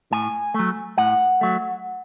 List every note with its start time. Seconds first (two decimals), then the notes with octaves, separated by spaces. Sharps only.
0.12 A2 G#5
0.54 F#3 A3
0.98 A2 F#5
1.41 F#3 A3